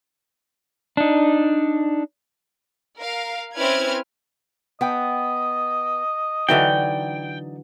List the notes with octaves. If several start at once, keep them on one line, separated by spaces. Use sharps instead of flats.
D4 D#4
A#4 F5
C4 C#4 E4 B4 F6 G#6
B3 D#5 G5
D3 E3 F#3 D#4 D5 G5